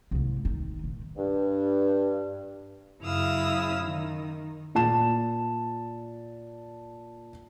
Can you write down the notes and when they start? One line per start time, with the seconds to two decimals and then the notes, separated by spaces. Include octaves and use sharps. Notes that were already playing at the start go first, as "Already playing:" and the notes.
0.11 C2 G#2
0.45 D#3
0.84 A#2
1.17 G2
3.03 F#2 C#3 E4 F5 D#6 E6
3.84 D#3
4.75 A#2 A5 E7